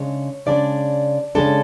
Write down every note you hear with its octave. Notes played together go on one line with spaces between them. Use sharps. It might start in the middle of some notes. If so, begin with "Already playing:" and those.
Already playing: C#3 G#3 D4 C#5
C#3 G#3 D4 D5
C#3 G#3 D4 A4